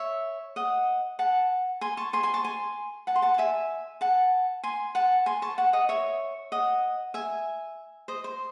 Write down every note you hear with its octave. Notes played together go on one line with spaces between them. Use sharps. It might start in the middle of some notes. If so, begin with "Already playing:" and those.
Already playing: C#5 E5
D#5 F#5
F#5 A5
G#5 C6
A5 C#6
G#5 C6
G#5 C6
A5 C#6
G#5 C6
F#5 A5
C6
F#5 A5
A5
E5 G#5
F#5 A5
G#5 C6
F#5 A5
G#5 C6
A5 C#6
F#5 A5
D#5 F#5
C#5 E5
D#5 F#5
E5 G#5
C5 D#5
C5